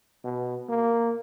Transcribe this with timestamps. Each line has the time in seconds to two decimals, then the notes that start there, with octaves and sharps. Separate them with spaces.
0.24 B2
0.69 A#3